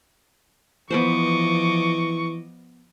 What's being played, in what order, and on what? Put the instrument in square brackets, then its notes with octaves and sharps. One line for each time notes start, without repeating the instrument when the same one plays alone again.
[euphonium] E3 [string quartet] F3 D#5 D6 [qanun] B3 B4 C5 [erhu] C#6